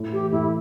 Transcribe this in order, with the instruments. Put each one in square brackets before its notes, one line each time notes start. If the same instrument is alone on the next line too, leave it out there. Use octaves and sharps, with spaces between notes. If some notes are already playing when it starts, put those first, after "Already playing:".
Already playing: [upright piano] A2
[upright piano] E3 [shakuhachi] G4
[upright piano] A2 [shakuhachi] E4